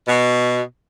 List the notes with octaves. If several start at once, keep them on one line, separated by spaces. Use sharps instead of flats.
B2